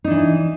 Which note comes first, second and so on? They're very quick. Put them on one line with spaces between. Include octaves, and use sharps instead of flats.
D#4 D4 E3